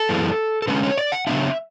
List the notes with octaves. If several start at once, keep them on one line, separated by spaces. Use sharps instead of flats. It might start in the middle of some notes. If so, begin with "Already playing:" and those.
Already playing: A4
F#2 E3 G#3 B3
A4
D3 G#3 C#4 B4
C#5
D5
F#5
C#3 F#3 B3 D4 E5